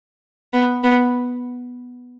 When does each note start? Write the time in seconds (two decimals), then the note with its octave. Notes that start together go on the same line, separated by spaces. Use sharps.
0.53 B3
0.84 B3